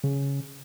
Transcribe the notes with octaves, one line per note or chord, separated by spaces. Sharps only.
C#3